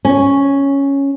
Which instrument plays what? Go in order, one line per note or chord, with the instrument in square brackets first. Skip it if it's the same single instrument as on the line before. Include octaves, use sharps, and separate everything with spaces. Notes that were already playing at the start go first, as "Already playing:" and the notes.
[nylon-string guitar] C#4